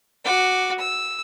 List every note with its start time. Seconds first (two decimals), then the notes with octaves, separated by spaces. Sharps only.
0.25 F#4 D6
0.78 E6